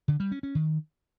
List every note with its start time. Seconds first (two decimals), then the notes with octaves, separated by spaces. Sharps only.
0.08 D3
0.20 G3
0.31 C#4
0.43 C#4
0.55 D#3